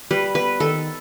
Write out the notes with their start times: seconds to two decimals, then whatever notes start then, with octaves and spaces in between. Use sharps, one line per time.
0.11 G3 B4
0.35 B3 B4
0.60 D#3 A4